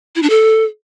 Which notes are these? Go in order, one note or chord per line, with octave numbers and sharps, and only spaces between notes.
E4
D4
A4